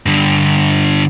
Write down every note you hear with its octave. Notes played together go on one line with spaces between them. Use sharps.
G2 D3